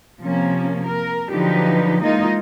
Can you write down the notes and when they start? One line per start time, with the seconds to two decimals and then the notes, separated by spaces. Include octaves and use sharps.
0.21 C3 F3 A#3 C#4
0.87 A#4
1.29 D3 F3 F#3 D#4 G4 B4
2.03 E3 G#3 A#3 D#4 F4 D#5